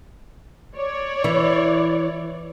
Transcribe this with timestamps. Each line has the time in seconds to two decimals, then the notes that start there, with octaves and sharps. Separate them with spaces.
0.75 C#5 D5
1.24 E3